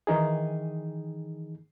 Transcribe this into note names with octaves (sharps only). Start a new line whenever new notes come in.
D#3 E3 D#4 G#4